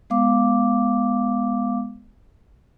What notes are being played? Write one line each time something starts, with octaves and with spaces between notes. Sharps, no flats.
G#3 B3 F5 D6